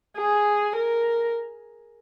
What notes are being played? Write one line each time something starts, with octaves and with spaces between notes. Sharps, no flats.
G#4
A#4